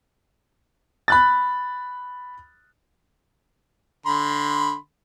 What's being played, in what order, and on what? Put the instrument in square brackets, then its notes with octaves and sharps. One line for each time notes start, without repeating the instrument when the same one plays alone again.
[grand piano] B5 F#6 A6
[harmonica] D3 B5 C6